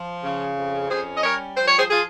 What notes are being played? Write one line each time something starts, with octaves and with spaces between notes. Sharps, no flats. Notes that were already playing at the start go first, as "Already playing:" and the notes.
Already playing: F3
C#3
F2
C#4 G#4 C5
D#5
G3 A#4 C#5
F3 C5
C#5
G#4 C5
F4 G#4